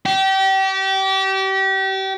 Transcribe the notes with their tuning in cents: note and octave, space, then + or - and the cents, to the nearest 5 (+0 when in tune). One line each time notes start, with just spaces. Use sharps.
G4 -30